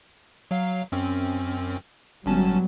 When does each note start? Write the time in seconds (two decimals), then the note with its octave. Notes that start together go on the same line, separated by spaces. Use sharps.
0.51 F#3 F5
0.92 F#2 C4 C#4
2.26 G1 F#3 G3 B3 C#4 A5